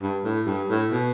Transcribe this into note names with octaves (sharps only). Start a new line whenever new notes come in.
G2
A2
G2
A2
B2